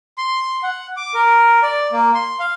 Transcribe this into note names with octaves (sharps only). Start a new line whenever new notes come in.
C6
F#5
D6
A#4
D5
A#3
C6
F5